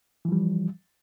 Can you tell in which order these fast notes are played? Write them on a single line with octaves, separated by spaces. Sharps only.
E3 F3 G3